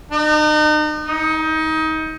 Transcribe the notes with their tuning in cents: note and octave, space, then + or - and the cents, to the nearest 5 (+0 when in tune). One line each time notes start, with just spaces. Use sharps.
D#4 -35
D#4 +25